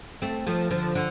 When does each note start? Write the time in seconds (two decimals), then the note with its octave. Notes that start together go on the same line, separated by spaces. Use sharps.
0.22 A3 C4
0.47 F3 A3
0.71 D3 F3
0.95 D3